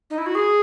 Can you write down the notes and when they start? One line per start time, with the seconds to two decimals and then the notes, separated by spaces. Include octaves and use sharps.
0.10 D#4
0.18 E4
0.26 F#4
0.35 G#4